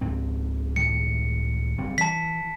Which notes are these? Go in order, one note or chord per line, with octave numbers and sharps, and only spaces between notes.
C#2 G#2 C4
C#2 A2 D#3 C#7
F#1 G3 C4
E3 A5 B6